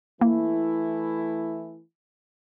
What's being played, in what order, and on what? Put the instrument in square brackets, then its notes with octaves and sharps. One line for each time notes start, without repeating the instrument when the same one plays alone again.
[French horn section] E3 A3 E4 [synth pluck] A#3